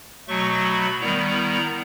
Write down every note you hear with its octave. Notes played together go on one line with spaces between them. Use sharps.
B2 F#3 A3 C#6
B5
D#3 G3 B3 E4 A#5
A#5